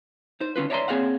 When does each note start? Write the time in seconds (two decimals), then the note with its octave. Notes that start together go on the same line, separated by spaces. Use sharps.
0.40 D#4 C5
0.56 D3 C#4 F4 B4
0.70 C#5 D5 E5 A5 A#5 C6
0.88 A#3 C4 G#4 C#5 F5 F#5